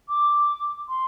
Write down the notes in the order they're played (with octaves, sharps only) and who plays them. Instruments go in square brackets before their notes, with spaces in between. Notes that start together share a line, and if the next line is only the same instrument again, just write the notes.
[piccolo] D6
C6